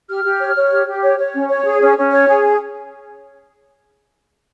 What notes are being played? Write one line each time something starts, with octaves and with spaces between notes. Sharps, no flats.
G4 F6
G4
C#5
C#5
G4
G4
C#5
C#5
C#4
C#5
G#4
C#4
C#4
C#5
G#4